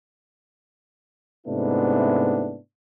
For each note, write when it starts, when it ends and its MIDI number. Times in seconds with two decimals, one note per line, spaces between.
1.47 2.57 44
1.47 2.57 48
1.47 2.57 57
1.47 2.57 59
1.47 2.57 62
1.47 2.57 64